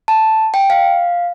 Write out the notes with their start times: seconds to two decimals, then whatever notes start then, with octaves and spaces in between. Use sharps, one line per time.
0.08 A5
0.54 G5
0.70 F5